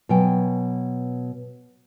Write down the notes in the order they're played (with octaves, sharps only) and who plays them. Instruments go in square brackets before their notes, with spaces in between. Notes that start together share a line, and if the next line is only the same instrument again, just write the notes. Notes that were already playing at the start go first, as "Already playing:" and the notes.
[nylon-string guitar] B2 F#3 G5 G#5